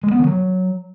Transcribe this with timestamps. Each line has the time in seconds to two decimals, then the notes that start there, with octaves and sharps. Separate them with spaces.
0.03 G#3
0.11 B3
0.19 D#3
0.27 F#3